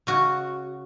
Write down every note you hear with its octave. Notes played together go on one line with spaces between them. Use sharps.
C#3 F#4